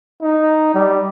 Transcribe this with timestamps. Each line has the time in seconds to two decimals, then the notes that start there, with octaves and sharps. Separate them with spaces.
0.22 D#4
0.75 G3